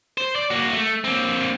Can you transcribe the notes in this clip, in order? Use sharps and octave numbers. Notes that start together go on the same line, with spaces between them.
C5
D5
A#3 F#4
A3
A#3 C4